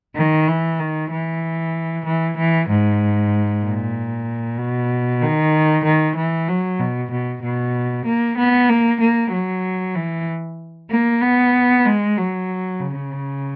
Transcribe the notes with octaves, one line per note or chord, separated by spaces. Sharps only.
D#3
E3
D#3
E3
E3
E3
G#2
A#2
B2
D#3
D#3
E3
F#3
B2
B2
B2
A#3
B3
A#3
A#3
F#3
E3
A#3
B3
G#3
F#3
C#3